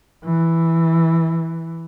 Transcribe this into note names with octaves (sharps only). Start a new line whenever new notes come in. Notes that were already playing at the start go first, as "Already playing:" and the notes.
E3